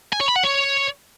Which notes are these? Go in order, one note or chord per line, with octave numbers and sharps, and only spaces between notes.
G#5
C#5
B5
F#5
C#5